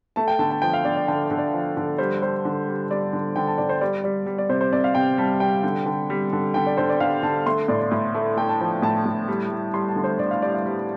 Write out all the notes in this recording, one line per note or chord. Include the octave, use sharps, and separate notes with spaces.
A3 A5
G5
D3 A5
A5
F3 G5
F5
D3 D5
D5
D3 G5
D3
D5
F3
D3
G3 C5
G3 C5
D3
G3
G3 D5
D3
D3 G5
A5
D3 D5
C5
G3 D5
G3 D5
G3
D5
C3 C5
C5
C3 D5
F5
C3 G5
G3 A5
G3 G5
D3
D3
G3
D3
D3 G5
D5
D3 C5
D5
D3 F5
D3 A5
A3 C6
A2 D5
D5
A2
A3
A3 G5
A5
F3
A2 A5
A2
G3
G3
G3 C6
A5
D3
C5
D3 D5
F5
G3 D5
F5
G3